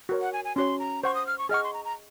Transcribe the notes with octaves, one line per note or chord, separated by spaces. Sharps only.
F#4 A#4 C#5
F#5
G#5
G#5
C#4 F#4 C#5 C6
A#5
C5 F#5 C6 C#6
D#6
F6
C#6
G#4 D#5 F#5 C#6 F6
C6
A#5
A#5